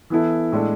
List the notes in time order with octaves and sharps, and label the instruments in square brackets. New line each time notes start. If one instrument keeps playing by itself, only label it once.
[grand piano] E3 B3 E4 A4
A2 G#3 D4 A4